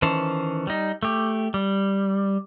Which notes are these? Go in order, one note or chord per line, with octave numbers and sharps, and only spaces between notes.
D#3 E3 C#4 C5 A5
G3 D#4
A3 G4
G3